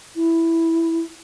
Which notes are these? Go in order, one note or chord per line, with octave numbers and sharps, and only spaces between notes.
E4